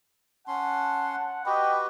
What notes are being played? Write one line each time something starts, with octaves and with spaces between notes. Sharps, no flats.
C#4 F#5 A5 C6
F#4 G4 B4 D#5 G5 B5